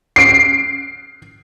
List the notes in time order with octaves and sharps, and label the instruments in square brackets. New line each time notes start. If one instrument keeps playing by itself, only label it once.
[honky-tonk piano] C7 D7